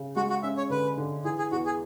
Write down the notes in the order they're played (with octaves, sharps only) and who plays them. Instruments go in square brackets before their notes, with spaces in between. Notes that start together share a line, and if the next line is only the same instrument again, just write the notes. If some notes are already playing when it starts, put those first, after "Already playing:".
Already playing: [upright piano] C#3
[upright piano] G#3 [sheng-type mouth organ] F#4
[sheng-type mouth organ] F#4
[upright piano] C#4 [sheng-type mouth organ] E5
[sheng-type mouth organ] C#5
[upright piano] D3 [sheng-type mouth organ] B4
[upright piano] D3
[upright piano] E3 [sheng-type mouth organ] G#4
[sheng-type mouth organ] G#4
[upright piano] E2 [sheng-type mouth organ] F#4
[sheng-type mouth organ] G#4